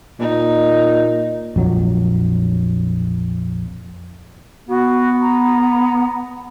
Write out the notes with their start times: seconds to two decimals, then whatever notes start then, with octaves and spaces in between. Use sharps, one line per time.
0.20 A#2 D#4
1.56 A#1 F2 F#3
4.69 B3 F#4
5.22 A#5